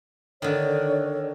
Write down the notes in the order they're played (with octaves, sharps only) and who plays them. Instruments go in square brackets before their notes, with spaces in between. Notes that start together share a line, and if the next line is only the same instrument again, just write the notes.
[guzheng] D3 D#3 [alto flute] C#5